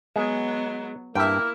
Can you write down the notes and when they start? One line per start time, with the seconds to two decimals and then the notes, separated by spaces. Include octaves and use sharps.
0.16 F#3 G#3 B3
1.15 G2 A#3 E4 E5 G5